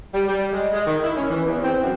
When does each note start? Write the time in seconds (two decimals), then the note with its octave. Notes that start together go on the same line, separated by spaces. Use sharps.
0.14 G3
0.28 G3
0.53 G#3
0.74 G#3
0.86 D#3
1.04 E4
1.16 C#4
1.30 E3
1.46 E2
1.63 C4
1.82 F#2